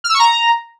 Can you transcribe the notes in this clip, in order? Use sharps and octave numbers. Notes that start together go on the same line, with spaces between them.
F6
E6
C#6
A#5